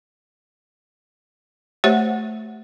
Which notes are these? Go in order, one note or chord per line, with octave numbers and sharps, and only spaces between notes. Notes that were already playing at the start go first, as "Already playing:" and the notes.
A3 G4 C5 C#5 E5 F#5